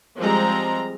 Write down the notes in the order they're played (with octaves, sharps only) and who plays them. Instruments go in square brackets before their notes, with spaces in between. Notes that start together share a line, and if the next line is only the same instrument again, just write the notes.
[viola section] F3 G3 G#3 C4 A#5